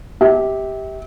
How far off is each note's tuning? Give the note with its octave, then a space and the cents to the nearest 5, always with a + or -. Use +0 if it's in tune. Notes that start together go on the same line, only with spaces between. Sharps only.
G4 +0 E5 -35